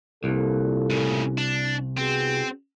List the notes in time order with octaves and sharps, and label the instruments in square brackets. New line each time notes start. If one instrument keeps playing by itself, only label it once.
[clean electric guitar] C2 [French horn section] A#2 A4
[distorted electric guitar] A2 C#3
D4
[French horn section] B3 F#4 G#4 [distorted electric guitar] C4